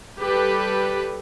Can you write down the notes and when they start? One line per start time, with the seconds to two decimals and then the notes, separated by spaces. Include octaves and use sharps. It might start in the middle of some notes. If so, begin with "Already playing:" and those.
0.17 G3 G4 A4 B4